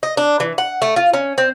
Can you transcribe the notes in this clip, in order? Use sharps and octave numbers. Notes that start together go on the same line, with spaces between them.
D#5
D4
E3
F#5
A3
F4
C#4
C4